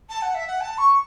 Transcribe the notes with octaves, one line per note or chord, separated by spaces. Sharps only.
A5
F#5
E5
F#5
A5
C#6